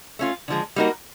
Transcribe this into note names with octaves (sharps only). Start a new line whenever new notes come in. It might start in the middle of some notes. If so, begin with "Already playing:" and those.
A3 C#4 F4
D3 F3 G#3
G3 A#3 D#4 F#4 A#4